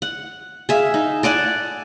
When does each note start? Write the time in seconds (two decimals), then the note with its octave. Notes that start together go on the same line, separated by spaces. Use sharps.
0.02 F#5
0.69 G#4 E5 F5
0.94 D#4
1.23 A4 D5 F#5 G#5